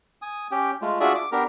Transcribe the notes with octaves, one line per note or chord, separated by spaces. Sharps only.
G#5 D#6
C#4 G4 G5
G#3 A3 F4
D4 F4 F#4 G#4 D5 E5
D6
B3 D4 G4 A#4 A#5